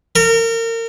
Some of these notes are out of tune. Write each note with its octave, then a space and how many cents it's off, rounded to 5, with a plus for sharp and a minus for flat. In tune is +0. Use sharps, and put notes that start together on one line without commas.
A#4 -30